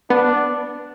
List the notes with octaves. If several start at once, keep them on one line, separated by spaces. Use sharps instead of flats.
B3 D4